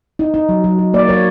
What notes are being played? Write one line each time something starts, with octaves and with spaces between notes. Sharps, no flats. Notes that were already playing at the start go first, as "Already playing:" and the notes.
D#4
D#4
F#3
F#3
F#3
A#3 D5
F#3 C#5